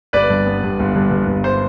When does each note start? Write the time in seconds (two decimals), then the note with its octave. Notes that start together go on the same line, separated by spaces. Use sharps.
0.13 G1 B4 D5
0.30 G2
0.47 B3
0.63 G2
0.79 G1
0.96 G2
1.11 G2
1.27 G1
1.44 C5